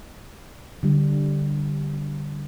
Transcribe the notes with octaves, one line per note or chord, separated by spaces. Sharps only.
D3 G3